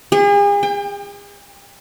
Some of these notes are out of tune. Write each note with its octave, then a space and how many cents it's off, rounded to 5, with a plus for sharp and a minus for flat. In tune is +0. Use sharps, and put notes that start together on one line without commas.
G#4 -40
G5 +30